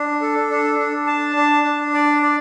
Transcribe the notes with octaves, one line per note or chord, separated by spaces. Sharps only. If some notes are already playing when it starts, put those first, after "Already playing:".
Already playing: D4
A4
D4
D4
A5
D4
D4
D5
D5